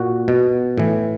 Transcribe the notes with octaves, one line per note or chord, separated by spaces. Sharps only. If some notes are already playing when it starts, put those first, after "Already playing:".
Already playing: A#2 F#4
B2
A2 E3